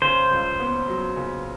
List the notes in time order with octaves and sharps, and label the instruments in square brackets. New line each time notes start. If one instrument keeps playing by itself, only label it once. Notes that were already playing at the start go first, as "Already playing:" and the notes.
[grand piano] C#3 [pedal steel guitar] C5
[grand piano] C#2
B3
F#3
C#3